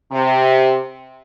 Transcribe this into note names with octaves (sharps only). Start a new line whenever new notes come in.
C3